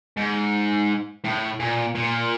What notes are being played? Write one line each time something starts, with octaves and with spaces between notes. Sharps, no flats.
G#2
A2
A#2
A#2